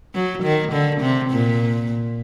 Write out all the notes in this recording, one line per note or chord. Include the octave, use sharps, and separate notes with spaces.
F#3
D#3
D3
C3
A#2